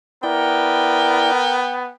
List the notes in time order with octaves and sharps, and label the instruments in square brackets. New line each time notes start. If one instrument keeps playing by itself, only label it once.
[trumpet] B3 [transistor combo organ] E4 D5 [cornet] A#4 [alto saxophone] G5